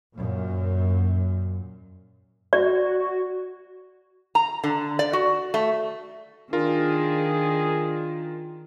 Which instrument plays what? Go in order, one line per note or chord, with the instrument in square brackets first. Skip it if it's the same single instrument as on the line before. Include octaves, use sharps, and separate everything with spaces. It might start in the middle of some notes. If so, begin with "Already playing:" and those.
[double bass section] F#2 A#2
[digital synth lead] F#4 [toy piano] D5
[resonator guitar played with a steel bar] A#5
D3
D5
F#4
A3
[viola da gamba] D#3 [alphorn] D4 [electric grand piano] F4 A#4 [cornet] G#4